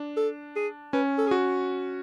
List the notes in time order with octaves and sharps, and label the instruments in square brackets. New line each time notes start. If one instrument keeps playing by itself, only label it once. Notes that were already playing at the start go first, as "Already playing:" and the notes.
Already playing: [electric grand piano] D4
[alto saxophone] A4
G#4
[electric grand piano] C#4 [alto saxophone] B4
[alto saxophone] A4
G#4
[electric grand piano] F#4